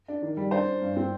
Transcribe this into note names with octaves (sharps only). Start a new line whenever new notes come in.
D4
D#3
G3
D4 C5
D4
G2
C4